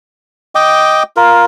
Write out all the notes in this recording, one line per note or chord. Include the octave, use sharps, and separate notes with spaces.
D#5 G5 D6
F4 A#4